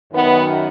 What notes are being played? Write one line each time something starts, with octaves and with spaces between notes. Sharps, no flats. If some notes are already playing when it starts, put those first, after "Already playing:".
F#2 D#3 B3